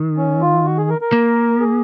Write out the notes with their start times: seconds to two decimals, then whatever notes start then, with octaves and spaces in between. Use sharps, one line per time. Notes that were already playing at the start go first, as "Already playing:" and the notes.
Already playing: D#3
0.17 C#4
0.41 F4
0.65 F#4
0.77 G#4
0.89 A#4
1.01 A#4
1.13 A#3
1.61 G#4